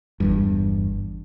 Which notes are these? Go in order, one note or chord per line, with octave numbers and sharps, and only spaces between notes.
G1 E2 G2